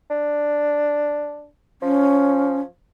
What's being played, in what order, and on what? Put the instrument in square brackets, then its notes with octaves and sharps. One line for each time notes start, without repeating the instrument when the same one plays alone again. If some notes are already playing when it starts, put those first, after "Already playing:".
[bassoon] D4
[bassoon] F3 [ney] C#4